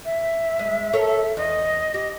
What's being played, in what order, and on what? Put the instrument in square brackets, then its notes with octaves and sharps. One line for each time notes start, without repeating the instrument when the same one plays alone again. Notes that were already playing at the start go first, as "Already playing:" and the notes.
[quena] E5
[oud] G#3
A4 A#4 C#5
[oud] E2 [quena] D#5
[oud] G4